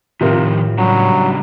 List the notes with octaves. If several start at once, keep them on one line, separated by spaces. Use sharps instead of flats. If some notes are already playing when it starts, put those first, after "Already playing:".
A2 C3 D#3 F3 F4 A#4
C#3 F#3 G3 D4